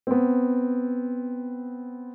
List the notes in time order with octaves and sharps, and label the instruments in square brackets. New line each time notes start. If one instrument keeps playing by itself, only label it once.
[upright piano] B3 C4